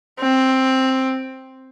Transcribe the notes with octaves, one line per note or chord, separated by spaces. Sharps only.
C4